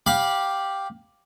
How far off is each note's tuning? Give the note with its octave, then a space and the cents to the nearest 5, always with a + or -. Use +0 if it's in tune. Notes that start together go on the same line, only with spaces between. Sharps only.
G4 +0 F5 +10 B5 -15